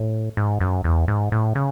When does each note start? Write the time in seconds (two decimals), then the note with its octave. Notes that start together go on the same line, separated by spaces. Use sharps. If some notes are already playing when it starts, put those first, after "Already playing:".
Already playing: A2
0.37 G#2
0.60 F#2
0.84 E2
1.08 G#2
1.32 A2
1.55 C#3